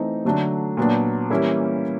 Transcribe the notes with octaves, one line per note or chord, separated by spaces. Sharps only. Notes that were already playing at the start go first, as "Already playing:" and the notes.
Already playing: E3 A3 C4 D#4
D3 F#3 A3 D4
A#2 F#3 B3 D4
E3 G3 A#3 C#4 E4